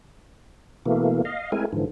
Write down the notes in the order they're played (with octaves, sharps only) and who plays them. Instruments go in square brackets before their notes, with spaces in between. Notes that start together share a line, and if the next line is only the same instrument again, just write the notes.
[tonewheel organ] B2 E3 A3 A#3
D#5 F5
G#3 A3 C4 E4 A#4 G#5
G#2 D3 E3 F3